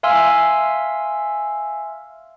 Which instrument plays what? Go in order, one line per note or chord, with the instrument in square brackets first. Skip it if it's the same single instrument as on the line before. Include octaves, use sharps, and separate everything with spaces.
[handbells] E5 F5 G#5 C6 E6 F6